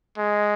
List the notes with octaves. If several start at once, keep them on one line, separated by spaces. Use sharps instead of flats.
G#3